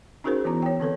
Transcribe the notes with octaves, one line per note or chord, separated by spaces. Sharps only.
C#4 D#4 F#4 G#4 A#4 C5
E3 B3 E4 A#5
C#5 G5
D3 C4 A4 B4